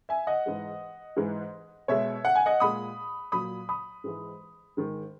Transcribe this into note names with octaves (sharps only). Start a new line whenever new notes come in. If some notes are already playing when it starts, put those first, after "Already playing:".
E5 G#5
D#5 F#5
G#2 E3 G#3
G#2 E3 G#3
B2 G#3 C#5 E5
F#5
G#5
D#5 F#5
A#2 G#3 B5 D#6
A#2 F#3 B5 D#6
B5 D#6
G#2 E3 G#3
G#2 D#3 G#3